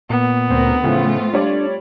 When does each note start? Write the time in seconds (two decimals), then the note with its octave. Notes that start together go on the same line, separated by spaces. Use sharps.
0.10 A#2 B3
0.50 D2 C4 A#4
0.84 A2 C#3 E3 F3 A3 C4 F4
1.33 G3 D4 C#5 D5